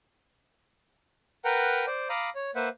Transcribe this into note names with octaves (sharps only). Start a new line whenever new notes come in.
A#4 B4 F#5 G5 A#5
C5 D5
F5 A#5 B5 D6 D#6
C#5
A#3 B4 C5 E5 F#5